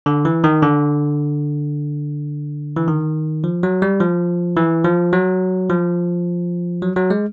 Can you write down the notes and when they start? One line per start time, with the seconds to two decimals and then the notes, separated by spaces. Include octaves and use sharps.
0.06 D3
0.25 E3
0.44 D#3
0.63 D3
2.76 E3
2.88 D#3
3.44 F3
3.63 F#3
3.82 G3
4.01 F3
4.57 E3
4.85 F3
5.13 F#3
5.69 F3
6.82 F#3
6.96 F#3
7.10 G#3